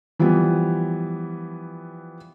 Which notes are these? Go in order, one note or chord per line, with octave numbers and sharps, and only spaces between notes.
E3 F3 G3 B3